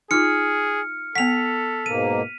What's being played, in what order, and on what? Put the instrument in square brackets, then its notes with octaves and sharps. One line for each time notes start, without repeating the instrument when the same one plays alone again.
[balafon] D#4 F4 [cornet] G#4 [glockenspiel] F6 C#7
[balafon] B3 F#5 [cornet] A4 [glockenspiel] B6 F7
[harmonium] G#2 B2 A#3 [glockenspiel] D#7